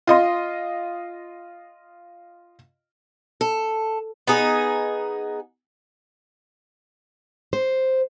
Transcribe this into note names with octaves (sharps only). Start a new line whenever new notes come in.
F4 D#5 C6
A4
B3 D#4 G#4
C5